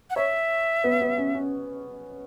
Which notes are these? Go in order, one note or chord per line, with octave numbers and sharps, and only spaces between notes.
F#5
C#5 E5
B3
B3
C#4
C#4